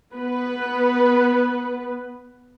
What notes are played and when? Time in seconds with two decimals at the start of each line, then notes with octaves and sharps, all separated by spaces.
0.14 B3 B4